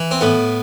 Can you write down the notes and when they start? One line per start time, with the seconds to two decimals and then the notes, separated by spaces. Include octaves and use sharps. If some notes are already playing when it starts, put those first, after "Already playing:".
Already playing: E3
0.11 C4
0.21 A2 B3